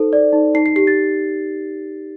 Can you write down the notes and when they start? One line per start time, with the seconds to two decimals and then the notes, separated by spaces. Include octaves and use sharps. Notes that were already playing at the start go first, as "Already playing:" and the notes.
Already playing: D#4 A4 C5
0.13 D5
0.33 D#4
0.55 D#4 C7
0.66 C7
0.76 G4 C7
0.87 A6